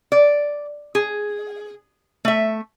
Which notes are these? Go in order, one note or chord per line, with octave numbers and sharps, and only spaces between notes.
D5
G#4
A3 E5